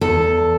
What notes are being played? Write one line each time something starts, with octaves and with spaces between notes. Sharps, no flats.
E2 A4